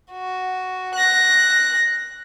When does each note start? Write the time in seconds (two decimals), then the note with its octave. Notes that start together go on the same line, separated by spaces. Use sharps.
0.12 F#4
0.95 F#6 A#6